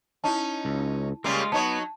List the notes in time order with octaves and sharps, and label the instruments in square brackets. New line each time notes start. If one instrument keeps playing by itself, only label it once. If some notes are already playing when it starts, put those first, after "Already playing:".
[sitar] C#4 D#4 [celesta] E4 A5
[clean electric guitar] C#2
[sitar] C#3 G3 A#3 [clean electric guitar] G#3 F4
[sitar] F#3 D#4 C#5 [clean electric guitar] B3 [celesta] A5